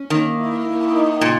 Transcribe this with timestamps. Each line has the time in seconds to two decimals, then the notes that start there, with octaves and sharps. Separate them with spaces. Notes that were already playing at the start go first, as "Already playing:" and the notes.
Already playing: C#4
0.10 D#3 A#3
0.38 E4
0.66 A#3
0.94 D#4
1.21 A#2 C#3